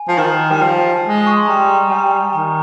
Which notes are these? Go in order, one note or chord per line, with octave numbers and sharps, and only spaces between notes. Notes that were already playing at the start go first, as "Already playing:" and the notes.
Already playing: G#5
F3
D#3
G3
F3
G#3
D#6
C#6
C6
G3 A#5
G3 G#5
D#3 A#5